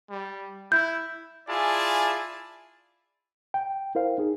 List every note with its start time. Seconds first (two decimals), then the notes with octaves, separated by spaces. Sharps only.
0.10 G3
0.72 E4 G6
1.48 E4 F4 G#4 D5 G#5 A5
3.54 G5
3.95 E4 A#4 C5 F5
4.18 D#4 G#4